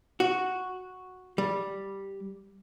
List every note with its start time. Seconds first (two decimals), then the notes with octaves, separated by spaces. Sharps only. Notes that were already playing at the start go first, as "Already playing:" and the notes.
0.20 F#4
1.38 G3